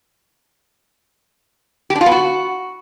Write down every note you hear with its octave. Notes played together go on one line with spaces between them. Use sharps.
G4
D4
F4
B3
F#4